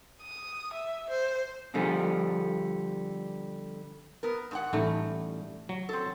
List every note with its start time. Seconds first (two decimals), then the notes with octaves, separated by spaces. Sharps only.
0.22 D#6
0.74 E5
1.10 C5
1.74 B2 D3 F3 G3 G#4
4.23 B3 A#4
4.51 G#2 A4 F#5
4.73 A1 G3 A3 D#4
5.69 F#3
5.89 C4 A4